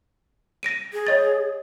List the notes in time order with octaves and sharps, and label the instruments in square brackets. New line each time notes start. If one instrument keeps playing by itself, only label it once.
[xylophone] A#6 D7 D#7
[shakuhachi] G#4
[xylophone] C#5 D#5 A6